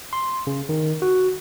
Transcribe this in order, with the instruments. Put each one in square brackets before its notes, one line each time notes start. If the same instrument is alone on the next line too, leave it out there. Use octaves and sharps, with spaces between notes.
[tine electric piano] C6
C#3
D#3
F#4